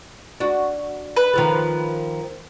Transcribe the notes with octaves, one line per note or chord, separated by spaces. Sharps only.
D4 F#4
B4
D#3 F3 A3